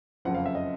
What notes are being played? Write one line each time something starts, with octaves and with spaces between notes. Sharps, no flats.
F#1 F2 C#3 F#5
F5
E5
D#5